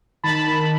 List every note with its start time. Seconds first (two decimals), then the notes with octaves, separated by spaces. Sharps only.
0.24 D#3 A5 B5
0.47 D#3